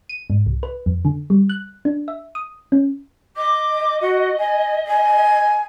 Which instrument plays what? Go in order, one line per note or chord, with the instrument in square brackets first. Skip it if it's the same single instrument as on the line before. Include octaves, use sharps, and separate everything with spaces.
[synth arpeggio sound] D#7
G#2
C2
B4
F2
D3
G3
F#6
D4
E5
D#6
C#4
[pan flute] D#5 [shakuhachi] D6
[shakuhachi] F#4
G#5
G#5